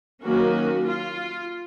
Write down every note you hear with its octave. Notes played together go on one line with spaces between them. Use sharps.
D#3 F#3 A#3 C#4 F#4
F4